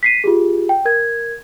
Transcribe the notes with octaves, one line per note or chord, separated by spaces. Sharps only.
B6 C7 D#7
F4 G4 G#4
G5
A#4 G#6